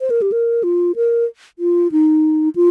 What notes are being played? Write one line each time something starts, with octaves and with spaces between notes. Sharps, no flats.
C5
A#4
G4
A#4
F4
A#4
F4
D#4
F4